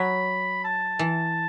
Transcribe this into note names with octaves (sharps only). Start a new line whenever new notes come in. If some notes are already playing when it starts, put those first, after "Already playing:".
Already playing: F#3 B5
A5
E3